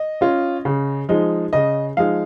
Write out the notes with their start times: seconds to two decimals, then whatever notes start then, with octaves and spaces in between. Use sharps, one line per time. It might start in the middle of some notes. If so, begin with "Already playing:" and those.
Already playing: D#5
0.21 C#4 F4
0.65 C#3
1.09 F3 G#3 D#4
1.53 C#3 D#5
1.97 F3 G#3 D#4 F5